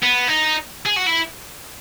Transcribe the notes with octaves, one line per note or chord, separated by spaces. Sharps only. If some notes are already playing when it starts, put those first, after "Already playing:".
B3
D#4
G#4
F#4
E4